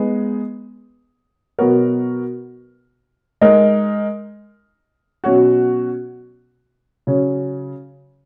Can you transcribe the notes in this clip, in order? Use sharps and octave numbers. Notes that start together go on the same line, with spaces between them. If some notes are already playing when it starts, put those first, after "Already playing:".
Already playing: G#3 B3 D#4 G#4
B2 F#3 B3 F#4 A#4
G#3 D#4 A#4
B2 F#3 C#4 F#4
C#3 F#3 C#4